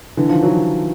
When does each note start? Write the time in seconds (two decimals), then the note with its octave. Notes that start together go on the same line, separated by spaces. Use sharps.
0.17 D3 E3
0.29 D#3 F3
0.42 E3 F#3